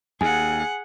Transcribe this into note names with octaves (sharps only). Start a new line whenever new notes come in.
D#2 G#4 F#5 G#5